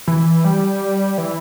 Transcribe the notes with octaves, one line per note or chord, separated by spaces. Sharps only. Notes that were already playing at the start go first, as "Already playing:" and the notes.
E3
G3
E3